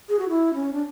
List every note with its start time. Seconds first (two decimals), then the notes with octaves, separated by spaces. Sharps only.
0.09 G#4
0.19 F#4
0.29 E4
0.54 C#4
0.73 D4